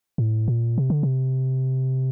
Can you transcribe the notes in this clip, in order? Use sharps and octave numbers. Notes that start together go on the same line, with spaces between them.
A2
A#2
C3
D3
C3